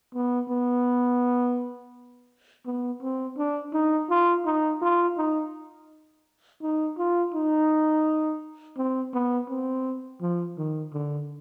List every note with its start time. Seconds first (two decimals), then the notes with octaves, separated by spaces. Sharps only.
0.15 B3
0.50 B3
2.66 B3
3.02 C4
3.38 D4
3.73 D#4
4.10 F4
4.46 D#4
4.82 F4
5.17 D#4
6.62 D#4
6.98 F4
7.34 D#4
8.77 C4
9.14 B3
9.49 C4
10.21 F3
10.58 D#3
10.93 D3